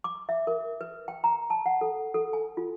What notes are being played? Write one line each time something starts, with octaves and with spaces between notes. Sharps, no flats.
D6
E5
A#4
B4
G5
A#5
A5
F#5
A4
A4
G#5
F4